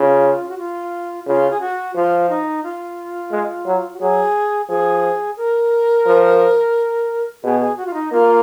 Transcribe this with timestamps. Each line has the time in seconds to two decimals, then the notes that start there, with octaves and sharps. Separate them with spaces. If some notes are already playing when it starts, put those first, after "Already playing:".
Already playing: C#3 F4
0.49 F#4
0.58 F4
1.26 C#3 F4
1.50 G#4
1.61 F#4
1.95 F3 F4
2.29 D#4
2.63 F4
3.31 G#3
3.66 F#3
3.94 F#4
4.00 F#3 G#4
4.69 F3 G#4
5.37 A#4
6.06 F3
7.43 B2 G#4
7.60 G#4
7.77 F#4
7.86 F4
7.94 D#4
8.12 A#3 F4